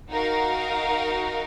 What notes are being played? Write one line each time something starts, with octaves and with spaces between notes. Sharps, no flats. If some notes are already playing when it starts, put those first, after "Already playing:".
D#4 F#4 A#4 F5